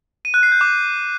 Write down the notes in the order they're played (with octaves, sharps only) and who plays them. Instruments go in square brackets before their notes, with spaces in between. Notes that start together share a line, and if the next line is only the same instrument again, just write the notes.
[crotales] D#7
F#6
C7
G6
D6